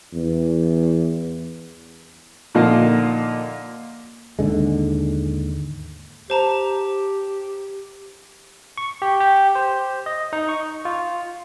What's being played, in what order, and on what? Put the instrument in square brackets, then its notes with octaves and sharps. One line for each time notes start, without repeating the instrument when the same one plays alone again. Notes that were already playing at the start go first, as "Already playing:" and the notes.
[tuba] E2
[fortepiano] A#2 D3 F3 A#3 D#4 F4
[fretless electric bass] D#2 G#2 D3 G#3
[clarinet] G4 [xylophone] C5 A5 A#5
[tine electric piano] C#6
G4
G4
C5
D#5
D#4
C#6
F4